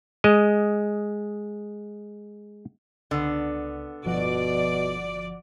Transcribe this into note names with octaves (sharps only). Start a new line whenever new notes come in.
G#3 D#5
C#2 D3 B3
G1 B2 F3 F#4 D5